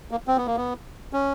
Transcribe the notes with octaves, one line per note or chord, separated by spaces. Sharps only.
A#3
C4
B3
A#3
B3
C#4